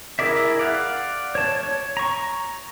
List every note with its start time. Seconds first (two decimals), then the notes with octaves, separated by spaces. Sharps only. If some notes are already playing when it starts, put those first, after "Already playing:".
0.19 E4 G#4 A#4 D5 E5
0.59 D5 F5 F#5
1.35 C#5 A5
1.63 C#5
1.97 A#5 C#6